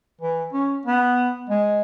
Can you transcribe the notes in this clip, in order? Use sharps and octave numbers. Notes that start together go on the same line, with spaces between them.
E3
C#4
B3
G#3